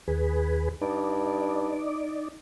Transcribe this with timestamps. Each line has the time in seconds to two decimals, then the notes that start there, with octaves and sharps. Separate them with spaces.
0.08 D#2 G#4 B4
0.82 G2 D#4 D5